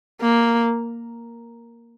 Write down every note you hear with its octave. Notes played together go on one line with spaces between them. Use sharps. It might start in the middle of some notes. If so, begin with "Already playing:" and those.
A#3